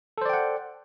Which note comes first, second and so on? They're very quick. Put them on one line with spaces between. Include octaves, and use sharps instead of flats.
A4 C5 D5 G5 F#5